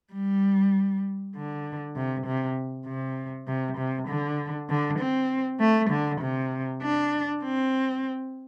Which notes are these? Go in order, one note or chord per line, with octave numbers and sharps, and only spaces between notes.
G3
D3
C3
C3
C3
C3
C3
D3
D3
C4
A3
D3
C3
D4
C4